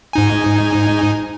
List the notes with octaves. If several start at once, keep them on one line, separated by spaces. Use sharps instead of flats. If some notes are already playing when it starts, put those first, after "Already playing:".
G#2 D#4 G#5